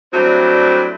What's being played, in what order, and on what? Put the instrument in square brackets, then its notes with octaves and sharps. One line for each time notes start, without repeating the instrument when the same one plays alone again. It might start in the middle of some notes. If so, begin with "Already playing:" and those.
[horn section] F#3 G3 A3 C4 D4 E4